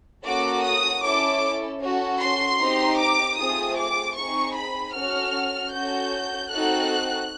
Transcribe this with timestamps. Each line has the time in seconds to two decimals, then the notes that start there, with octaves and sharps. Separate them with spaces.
0.24 A#3 C#4 F#4 A4 D6
0.63 D#6
1.02 C#4 E4 A4 D6
1.81 C#4 F#4 A4
2.20 C6
2.59 C4 D#4 G4
2.98 D6
3.37 A3 C4 F4 G#4 D#6
3.76 D6
4.16 C4 D#4 G#4 C#6
4.55 B5
4.94 C#4 F#4 A4 F6
5.73 C#4 F#4 A4 G6
6.51 C4 D#4 F#4 A4 F#6